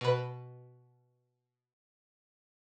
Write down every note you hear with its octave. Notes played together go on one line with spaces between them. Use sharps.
B2 B4